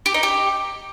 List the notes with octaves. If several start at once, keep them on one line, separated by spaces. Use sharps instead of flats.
G4
D#4
G4